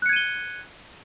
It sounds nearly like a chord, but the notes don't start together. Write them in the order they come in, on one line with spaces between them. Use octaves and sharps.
F#6 C#7 G#6 D#7 G7